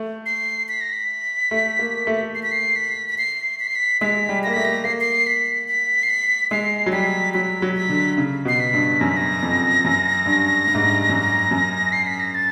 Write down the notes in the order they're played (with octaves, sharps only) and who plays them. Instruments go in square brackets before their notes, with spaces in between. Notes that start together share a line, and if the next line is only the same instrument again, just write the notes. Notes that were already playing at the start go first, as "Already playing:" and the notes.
Already playing: [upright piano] A3
[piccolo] C7
B6
A#6
B6
[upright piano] A3
A#3
A3
[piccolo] C7
B6
C7
B6
B6
C7
B6
C7
B6
[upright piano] G#3 [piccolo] B6
[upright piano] G3
[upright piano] A#3 [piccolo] A#6
[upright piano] A3 [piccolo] B6
[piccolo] A#6
[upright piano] A#3 [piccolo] C7
[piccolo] C7
B6
B6
C7
B6
[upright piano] G#3 [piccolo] C7
[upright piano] F#3
[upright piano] G3 [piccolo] B6
[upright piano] F#3 [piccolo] B6
[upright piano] F#3
[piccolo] B6
[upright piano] D3
C#3
[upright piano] B2 [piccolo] C7
[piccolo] B6
[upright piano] G2
[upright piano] F#2 [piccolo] A#6
[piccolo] B6
A#6
[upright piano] F2
F#2
G2
G2
G#2
G2
F#2
F#2
[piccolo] C7
B6
A#6
A6